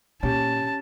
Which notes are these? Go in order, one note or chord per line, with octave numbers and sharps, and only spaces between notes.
A#2 C#4 G4 A5